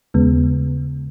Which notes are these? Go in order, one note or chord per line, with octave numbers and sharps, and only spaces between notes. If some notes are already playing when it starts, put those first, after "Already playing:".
D#2 C#3 G#3 B3